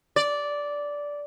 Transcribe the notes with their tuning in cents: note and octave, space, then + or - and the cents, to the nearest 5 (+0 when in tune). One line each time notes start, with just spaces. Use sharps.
D5 -10